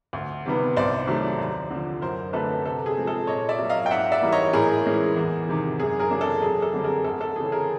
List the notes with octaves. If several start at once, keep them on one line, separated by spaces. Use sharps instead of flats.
D2
C3 D#3 G3 B3
C2 C5 D5
C3 D#3 F#3 A3
D#2
D3 F3
F#2 A#4 C5
D3 F#3 A3 C4 A4 B4
C3 A4
G#4
F3 G#3 C4
A4
A#2 C#5 D#5
D5 E5
F#3 A#3
D#5 F5
G5
G#2 E5 F#5
D5 E5
E3 G3 A#3 D#4
C#5 D#5
A2 G#4 A#4
E3 G#3 C#4
E2
C3 D#3
F#2 G#4
G#4 A#4
C#3 F#3 A#3 D4
A4
F#2 G#4
A4
D3 G3 C4
G#4 A#4
D2 A4
A4
C#3 E3 G#4
G#4 A#4